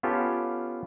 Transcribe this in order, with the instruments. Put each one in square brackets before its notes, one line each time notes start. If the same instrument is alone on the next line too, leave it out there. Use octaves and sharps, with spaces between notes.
[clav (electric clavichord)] B3 C#4 F4 G4 A4